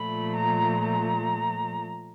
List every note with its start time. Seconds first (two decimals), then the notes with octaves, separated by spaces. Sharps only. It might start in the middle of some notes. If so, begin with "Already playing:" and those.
Already playing: A#2 F3 A3 B5
0.36 A#5
0.83 A#5